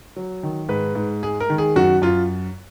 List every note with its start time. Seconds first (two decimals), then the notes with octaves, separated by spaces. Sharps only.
0.16 F#3
0.43 D#3
0.69 G#2 B4
0.95 G#2
1.23 G#3 G#4
1.40 A#4
1.50 D#3
1.58 G#4
1.76 F#2 F#4
2.02 F#2 F4